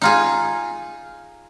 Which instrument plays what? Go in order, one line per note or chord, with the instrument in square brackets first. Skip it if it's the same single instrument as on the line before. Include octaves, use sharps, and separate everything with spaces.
[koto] D#4 F4 G#4